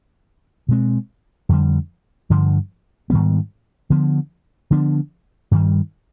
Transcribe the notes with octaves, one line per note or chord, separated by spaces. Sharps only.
B2 G#3 C4
F2 D3 G3
G2 D3 F3
G#2 D#3 G3 B3
D3 F3 B3
D3 F3 B3 D4
G2 D#3 G3